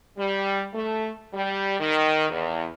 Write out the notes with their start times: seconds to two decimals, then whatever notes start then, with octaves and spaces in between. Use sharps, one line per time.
0.18 G3
0.74 A3
1.34 G3
1.80 D#3
2.30 E2